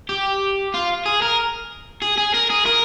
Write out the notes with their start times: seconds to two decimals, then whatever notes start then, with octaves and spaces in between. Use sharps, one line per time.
0.09 G4
0.74 F4
1.05 G#4
1.22 A#4
2.02 G#4
2.17 G#4
2.34 A#4
2.50 G#4
2.66 A#4